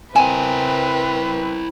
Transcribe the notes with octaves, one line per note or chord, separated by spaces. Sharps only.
C4 E4 A#4 B4 G#5